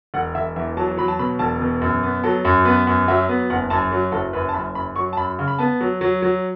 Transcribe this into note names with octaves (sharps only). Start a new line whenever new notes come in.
E1 F#5
E1 E5
E2 E5
F#3 A5
F#3 B5
A5
B2 B5
E1 A5
B2
F#2
B3
F#3 A4
F#2
B3 B4
F#2
F#3 E5
B3
F#1 F#5
F#2 A5
F#3
F#1 A4
F#2 B4
A5
F#1 B5
F#2 B5
F#3 C#6
A5
F#2 B5
C#3
B5
B3 A5
F#3
F#3
F#3